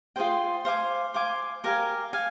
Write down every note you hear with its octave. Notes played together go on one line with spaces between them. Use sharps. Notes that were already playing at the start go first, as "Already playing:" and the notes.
F4 G#4 C5 G5
C5 F5 G#5 D6
C5 F5 G#5 D6
G4 A#4 F5 G#5
F5 G#5